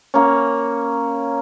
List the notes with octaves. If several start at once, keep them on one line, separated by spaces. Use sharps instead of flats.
A#3 C#4